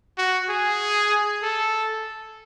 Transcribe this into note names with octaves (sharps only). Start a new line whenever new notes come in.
F#4
G#4
A4